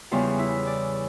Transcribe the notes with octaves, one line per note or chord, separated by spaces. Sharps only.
E2 C#3 G3 F4
E4
D5